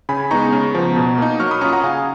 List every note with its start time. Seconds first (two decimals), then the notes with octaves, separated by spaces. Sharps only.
0.09 C#3 G#5 B5
0.31 G#3 B3 D#4 A#5 C#6
0.52 C#3
0.75 F3 B3
0.96 B2
1.18 A#3 D#4
1.40 F#3 C#6 F6
1.51 B5 D#6
1.61 C#4 F4 A#5 C#6
1.73 F#5 A#5
1.84 C#3 F5 G#5